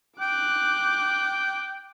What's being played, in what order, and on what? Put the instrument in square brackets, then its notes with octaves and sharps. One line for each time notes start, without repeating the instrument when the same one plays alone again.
[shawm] G5 [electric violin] D6 F#6